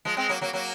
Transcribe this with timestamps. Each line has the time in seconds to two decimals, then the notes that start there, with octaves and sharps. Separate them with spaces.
0.05 F3 G#3
0.17 G#3 C4
0.29 F#3 A#3
0.41 F#3 A#3
0.53 F#3 A#3